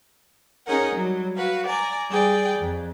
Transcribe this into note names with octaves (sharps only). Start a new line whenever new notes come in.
C#4 D#4 G#4 A#4 F#5
F#3 G3
F#4 B4 F5
D5 G#5 A#5
G3 G#4 D5 G5
F2